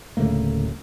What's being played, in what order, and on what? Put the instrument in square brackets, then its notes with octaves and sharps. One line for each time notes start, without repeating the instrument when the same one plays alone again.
[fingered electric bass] D1 C#3 A3 A#3